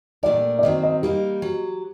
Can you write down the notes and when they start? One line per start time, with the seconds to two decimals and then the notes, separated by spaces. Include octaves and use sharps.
0.23 A#2 A3 D4 G4 A#4 D5
0.59 D5
0.63 D#3 F#3 C4 D#5
0.83 D#5
1.02 G3 A#3 D#4 G4
1.42 F#3